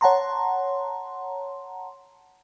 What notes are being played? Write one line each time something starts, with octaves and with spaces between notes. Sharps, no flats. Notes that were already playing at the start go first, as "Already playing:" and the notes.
C#5 F#5 A5 A#5 C6